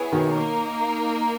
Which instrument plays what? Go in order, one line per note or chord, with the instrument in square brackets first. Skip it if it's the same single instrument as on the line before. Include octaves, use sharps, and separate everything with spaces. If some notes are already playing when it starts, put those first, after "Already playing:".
Already playing: [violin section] B3 E4 G#4 C#5
[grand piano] B2 D#3
[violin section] A#3 D#4 A#4